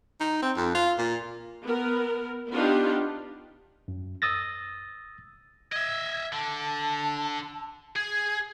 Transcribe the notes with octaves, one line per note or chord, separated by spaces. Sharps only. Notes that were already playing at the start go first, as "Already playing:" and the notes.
D#4
C4
F2
F4
A#2
B3 A#4
B3 D4 D#4 F4 G4
F#2
D#6 E6 A6 A#6
D#5 E5 G#6
D3 A5
G#4 G#6